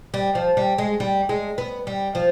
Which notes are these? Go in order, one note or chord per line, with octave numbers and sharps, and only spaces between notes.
G3
F3
G3
G#3
G3
G#3
B3
G3
F3